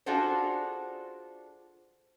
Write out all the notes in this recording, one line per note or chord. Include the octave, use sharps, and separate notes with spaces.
D4 F4 F#4 G#4 A4 C5